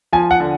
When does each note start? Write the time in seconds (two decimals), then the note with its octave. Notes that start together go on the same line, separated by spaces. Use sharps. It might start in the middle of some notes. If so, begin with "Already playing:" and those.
0.13 F3 G#5
0.31 F#5
0.40 D3